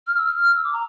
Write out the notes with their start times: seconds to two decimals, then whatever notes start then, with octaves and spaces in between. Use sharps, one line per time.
0.07 F6
0.16 E6
0.25 F6
0.54 E6
0.63 D6
0.72 A#5